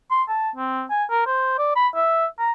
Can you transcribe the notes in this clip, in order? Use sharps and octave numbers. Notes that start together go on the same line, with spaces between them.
C6
A5
C4
G#5
A#4
C5
D5
B5
E5
A#5